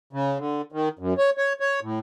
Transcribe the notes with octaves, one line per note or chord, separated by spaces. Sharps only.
C#3
D3
D#3
F#2
C#5
C#5
C#5
A2